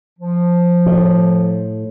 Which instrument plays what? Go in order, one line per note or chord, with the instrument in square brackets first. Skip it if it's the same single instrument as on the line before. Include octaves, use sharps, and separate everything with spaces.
[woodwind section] F3
[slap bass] A2